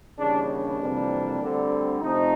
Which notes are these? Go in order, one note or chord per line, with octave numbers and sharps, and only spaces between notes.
D#2 C#3 E3 G3 D4
D4
F2 C3 E3 G3 A#3
D2 D3 G3 C4
F2 C3 F3 A3 C4 D#4